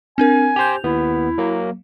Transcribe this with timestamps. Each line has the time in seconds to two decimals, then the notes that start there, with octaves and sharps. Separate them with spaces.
0.18 C4 D4 A#4 G#5
0.56 G4 C5 G6 F7
0.84 D#2 B3 E4
1.38 F#3 A#3